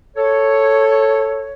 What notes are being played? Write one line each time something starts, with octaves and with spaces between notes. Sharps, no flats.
A4 C#5